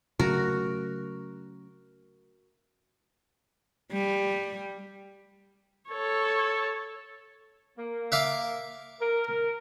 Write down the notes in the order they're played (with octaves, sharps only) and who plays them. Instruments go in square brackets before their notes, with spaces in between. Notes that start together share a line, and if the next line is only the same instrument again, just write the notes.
[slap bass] C#3 F#3 A3 [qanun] F#4 A#4
[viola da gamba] G3
[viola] A4 C#5
[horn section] A#3
[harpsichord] E5 F5 D6
[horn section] A#4